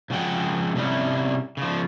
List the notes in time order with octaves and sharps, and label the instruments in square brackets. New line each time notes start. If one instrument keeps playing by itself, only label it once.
[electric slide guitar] C#3 F3 G#3 F#5 G5
C3 G3 C#4 E4
C#3 F3